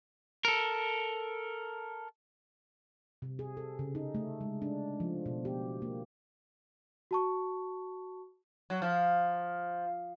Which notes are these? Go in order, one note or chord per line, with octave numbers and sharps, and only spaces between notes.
A4 A#4
C3
G#4
A4
C#3
D#4
A3
G#3
D4
F3
B2
G4
A#3
F#4 A5 C#6
F#3
F3